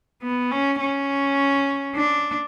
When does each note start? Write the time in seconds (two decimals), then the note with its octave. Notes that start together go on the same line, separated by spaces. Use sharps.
0.22 B3
0.51 C#4
0.80 C#4
1.95 D4